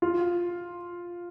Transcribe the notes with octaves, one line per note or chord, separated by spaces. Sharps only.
F4